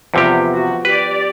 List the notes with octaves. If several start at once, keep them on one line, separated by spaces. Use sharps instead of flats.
E2 C3 F3 B3 F4 G4
F#4
G4 B4 D5